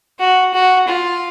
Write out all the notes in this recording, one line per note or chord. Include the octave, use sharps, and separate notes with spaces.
F#4
F#4
F4